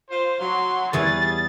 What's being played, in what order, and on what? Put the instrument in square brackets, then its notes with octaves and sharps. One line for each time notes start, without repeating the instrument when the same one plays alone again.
[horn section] F4 C5
[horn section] F#3 [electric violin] C6
[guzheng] E2 E3 C#5 [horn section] G3 G#4 [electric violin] A6